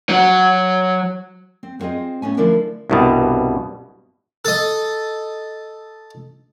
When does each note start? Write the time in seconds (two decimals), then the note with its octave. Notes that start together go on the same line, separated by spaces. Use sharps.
0.09 F#3 F#5
1.63 C4
1.79 B3 C4 F4 G#4 D#5
2.22 A2 B3 C#4 G#5
2.37 D3 F3 A3 D4 E4 A#4
2.90 C2 G2 B2
4.45 A4 D#5